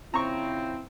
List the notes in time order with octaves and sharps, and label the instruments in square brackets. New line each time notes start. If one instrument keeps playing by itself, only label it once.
[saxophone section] C#3 F3 C4 [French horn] E4 [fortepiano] A#5 C#6